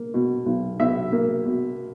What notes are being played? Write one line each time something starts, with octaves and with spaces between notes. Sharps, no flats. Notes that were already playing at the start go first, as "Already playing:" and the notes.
Already playing: A#3
B2
B1
B1 E5
A#3
B2